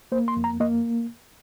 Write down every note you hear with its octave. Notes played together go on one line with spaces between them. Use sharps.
A#3 C5
C6
F2
A#5
A#3 D#5